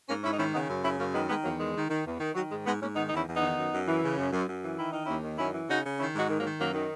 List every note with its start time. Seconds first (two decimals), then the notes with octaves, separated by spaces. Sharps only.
0.08 G#2 A#3 C#4
0.23 G#2 C#4 E4
0.32 D#4
0.38 D#3 C#4 E4
0.53 C#3 B3 D#4
0.69 F#2
0.84 C#3 C#4 E4
0.99 F#2 A#3 C#4
1.14 D#3 G#3 B3
1.29 D#3 G#3 B3
1.44 E2 F#3 A#3
1.60 D#3 G#3
1.75 D#3
1.90 D#3
2.05 E2
2.20 D#3
2.35 D#3 F#3
2.50 G#2 G#3
2.65 G#2 G#3 B3
2.81 G#2 A#3 C#4
2.95 D#3 B3 D#4
3.07 D#4
3.11 E2
3.16 C#4 E4
3.26 E2
3.37 D#3 B3 D#4
3.57 F#2
3.72 F#2
3.87 E3
4.03 C#3
4.18 F#2
4.32 F#2
4.47 F#2
4.63 E3
4.78 D#3 E4
4.92 D#3 D#4
5.05 D#2 C#4 E4
5.23 D#3
5.38 F#2 C#4 E4
5.53 E3
5.69 C#3 D#4 F#4
5.84 C#3
5.99 D#3 C#4 E4
6.14 G#2
6.19 D#4 F#4
6.29 D#3
6.39 F#3 A#3
6.45 D#3
6.59 F#2 F#3 A#3
6.74 D#3